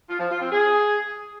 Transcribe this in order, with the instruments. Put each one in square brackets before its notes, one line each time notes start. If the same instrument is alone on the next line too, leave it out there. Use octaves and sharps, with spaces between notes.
[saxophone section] F4
F3
F4
C4
G#4